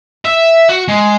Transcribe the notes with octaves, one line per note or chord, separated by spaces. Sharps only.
E5
F#4
G#3